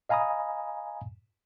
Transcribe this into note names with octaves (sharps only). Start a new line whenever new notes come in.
D#5 F5 G#5 A#5 B5 D#6